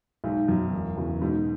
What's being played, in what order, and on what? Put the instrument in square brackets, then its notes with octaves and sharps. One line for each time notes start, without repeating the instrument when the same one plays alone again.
[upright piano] B1 [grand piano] G#2
[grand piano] F#2 [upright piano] B2 F#3
[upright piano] E1
E2 C#3 F#3
[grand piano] G#2 [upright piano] B2